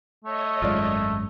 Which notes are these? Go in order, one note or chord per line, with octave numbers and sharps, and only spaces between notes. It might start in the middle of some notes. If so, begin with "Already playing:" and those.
A3 C#5 D#5
G#1 F#2 G#3 F4 D5